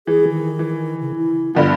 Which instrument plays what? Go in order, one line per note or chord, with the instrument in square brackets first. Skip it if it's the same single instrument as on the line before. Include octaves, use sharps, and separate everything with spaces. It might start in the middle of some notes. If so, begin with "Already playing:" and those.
[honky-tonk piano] E3 [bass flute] G#4
[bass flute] D#3
[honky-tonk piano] E3
[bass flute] C#3
E4
[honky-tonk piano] G2 D3 F3 [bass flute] B3